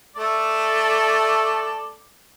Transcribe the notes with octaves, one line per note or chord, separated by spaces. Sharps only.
A3 A4 D5